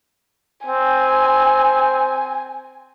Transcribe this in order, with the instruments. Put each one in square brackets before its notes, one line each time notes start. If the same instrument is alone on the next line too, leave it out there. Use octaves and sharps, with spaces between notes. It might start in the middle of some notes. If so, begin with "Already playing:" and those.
[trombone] C4 [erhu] G#5